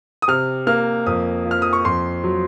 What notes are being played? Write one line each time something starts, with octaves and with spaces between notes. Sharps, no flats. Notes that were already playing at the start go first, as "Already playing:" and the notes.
D#6
C3 F6
A#3 F6
F2 D#6
F3
F6
D#6
C#6
F2 C6
F#3